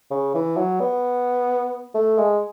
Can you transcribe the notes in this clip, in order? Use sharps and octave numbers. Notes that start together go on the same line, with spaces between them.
C#3
E3
F#3
B3
A3
G#3